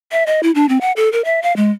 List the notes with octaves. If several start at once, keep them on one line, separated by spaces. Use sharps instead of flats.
E5
D#5
E4
D4
C4
F#5
A4
A#4
E5
F5
G#3